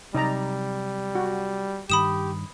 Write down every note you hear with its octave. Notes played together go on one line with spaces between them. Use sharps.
C3 F#3 G3 D#4 D5 A#5
F#4
G2 D#3 G4 B5 D#6 E7